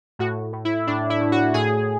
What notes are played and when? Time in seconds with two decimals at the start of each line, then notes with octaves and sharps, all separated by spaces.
0.19 A2 F#4
0.53 A2
0.65 E4
0.87 A2 D4
1.10 E4
1.21 A2
1.32 F#4
1.54 A2 G#4